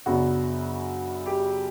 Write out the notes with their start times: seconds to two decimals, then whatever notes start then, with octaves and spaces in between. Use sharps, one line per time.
0.06 F#2 C#3 F#3 B3 D4 F#4
1.26 G4